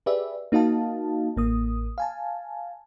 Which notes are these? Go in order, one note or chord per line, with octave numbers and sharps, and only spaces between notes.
G4 G#4 B4 D5 E5
A#3 D#4 F#4 D#5 F5 A5
A1 A#3 D#6
F5 G#5 A5